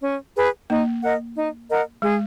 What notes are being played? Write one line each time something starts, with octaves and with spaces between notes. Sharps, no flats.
C#4
G#4 B4
A#3 D#4
A#4 D#5 F#5
D#4
A#4 D#5 F#5
G#3 G#4